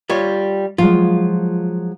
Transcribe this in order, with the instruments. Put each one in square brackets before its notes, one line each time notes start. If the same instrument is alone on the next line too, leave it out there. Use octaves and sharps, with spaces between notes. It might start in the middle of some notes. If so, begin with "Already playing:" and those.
[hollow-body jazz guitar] G3 F4 C#5
[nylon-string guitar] F3 F#3 G#3 [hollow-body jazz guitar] F4